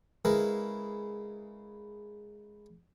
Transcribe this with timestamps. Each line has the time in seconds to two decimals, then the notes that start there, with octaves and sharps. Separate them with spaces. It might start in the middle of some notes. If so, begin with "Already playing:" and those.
0.25 C#3 G#3 E4 A#4 B4